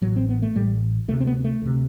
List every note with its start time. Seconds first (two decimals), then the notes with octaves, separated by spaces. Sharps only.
0.02 A1 A2 F#3
0.16 C4
0.29 B3
0.42 A3
0.55 A1 A2 G3
1.08 D2 C3 A3
1.20 C4
1.27 B3
1.44 A3
1.62 D2 C3